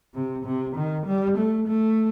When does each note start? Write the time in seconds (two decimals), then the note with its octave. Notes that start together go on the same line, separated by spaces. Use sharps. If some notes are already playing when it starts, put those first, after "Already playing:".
0.14 C3
0.45 C3
0.76 D#3
1.06 G3
1.37 A3
1.67 A3